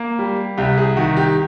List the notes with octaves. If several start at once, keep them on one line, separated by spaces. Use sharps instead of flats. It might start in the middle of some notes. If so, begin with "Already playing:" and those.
Already playing: A#3
G3
C2 G4
G#4
D#3 F#4
G4